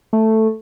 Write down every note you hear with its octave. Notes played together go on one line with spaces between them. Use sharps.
A3